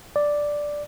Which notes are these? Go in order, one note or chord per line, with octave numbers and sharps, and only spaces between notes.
D5